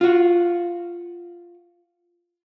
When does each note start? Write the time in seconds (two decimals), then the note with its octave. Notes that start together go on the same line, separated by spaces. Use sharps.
0.01 F4 F#4